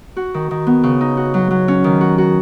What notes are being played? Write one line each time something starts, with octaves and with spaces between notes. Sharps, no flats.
F#4
D#3
D#3
B3
C#3
D#4
F#4
F#3
F#3
C#4
D#3
F#4
F#4